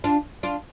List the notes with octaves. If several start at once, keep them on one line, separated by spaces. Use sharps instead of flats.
D4 F4
D4 F4